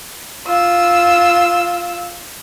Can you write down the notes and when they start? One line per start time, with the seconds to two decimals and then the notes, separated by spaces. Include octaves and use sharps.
0.47 F4 E6